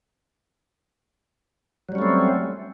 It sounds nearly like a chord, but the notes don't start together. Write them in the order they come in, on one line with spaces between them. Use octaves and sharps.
F#3 G3 C#4 A3 C4